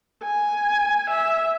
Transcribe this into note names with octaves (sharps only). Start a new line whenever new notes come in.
G#5
E5